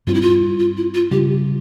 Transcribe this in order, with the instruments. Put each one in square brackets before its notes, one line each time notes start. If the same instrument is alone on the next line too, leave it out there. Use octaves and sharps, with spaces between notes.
[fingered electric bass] G2 G3 C4 [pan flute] F4
[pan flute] E4
F4
F4
E4
F4
[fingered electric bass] C#3 G3 [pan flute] G4